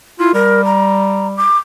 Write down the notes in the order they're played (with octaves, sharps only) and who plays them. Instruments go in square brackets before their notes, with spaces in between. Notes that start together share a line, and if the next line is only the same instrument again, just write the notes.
[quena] E4 [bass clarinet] F4
[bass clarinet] G3 [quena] A#4
[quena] A#5
D6